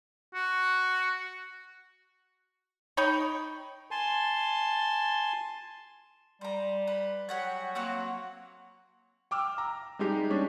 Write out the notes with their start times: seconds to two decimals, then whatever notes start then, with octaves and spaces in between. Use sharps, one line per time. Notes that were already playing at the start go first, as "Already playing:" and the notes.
0.34 F#4
2.97 D#4 C#5 G5 B5
3.91 G#5 A5 C6
6.41 G3 C5 A#5
6.87 B4
7.29 F#3 G4 F#5 G#5
7.75 A#3 C4 F#4 C#5
9.31 G5 D6 E6 F6
9.58 A#5
9.99 G3 G#3 D#4 G4
10.30 G3 C#4 D4